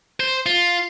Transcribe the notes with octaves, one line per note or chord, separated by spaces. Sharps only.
C5
F4